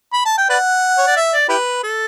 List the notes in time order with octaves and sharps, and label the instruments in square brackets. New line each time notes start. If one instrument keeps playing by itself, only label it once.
[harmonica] B5
A5
G5
B4 D5 F#5
C#5
D5
E5
D5
E4 G4 B4
A4